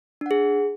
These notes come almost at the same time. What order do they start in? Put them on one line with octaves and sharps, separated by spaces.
D4 F#5 G#4